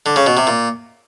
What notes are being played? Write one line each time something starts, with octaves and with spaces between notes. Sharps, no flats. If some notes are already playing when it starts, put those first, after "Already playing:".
D3
C#3
B2
C3
A#2